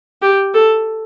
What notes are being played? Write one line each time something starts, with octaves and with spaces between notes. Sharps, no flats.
G4
A4